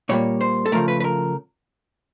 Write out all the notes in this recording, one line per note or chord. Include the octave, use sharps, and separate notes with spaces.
A#2 G3 A#3 C#5
C5
A4
C#3 F3 A3 A#4
B4
B4
A#4